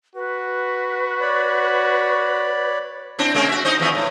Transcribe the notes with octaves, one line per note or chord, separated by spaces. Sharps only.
F#4 B4
C#5 D5 B5
C4 D4 E4
G#3 A#3 C#4
F#4 E5
D#4 C5 D#5
E2 F3 E5
A2